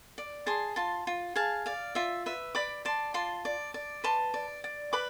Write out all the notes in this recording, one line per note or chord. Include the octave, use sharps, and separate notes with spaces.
D5
G#4 A5 C6
F4 A5 C6
F4
G#4 F5 A5
D5 F5
F4 E5
B4 E5
D5 B5 D6
D5 A5 C6
F4 A5 C6
D5
D5
B4 A5 C6
D5
D5
B4 B5 D6